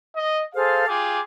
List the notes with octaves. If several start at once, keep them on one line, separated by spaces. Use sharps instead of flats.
D#5
G#4 A4 C5 F5
F4 G4 G#4 D6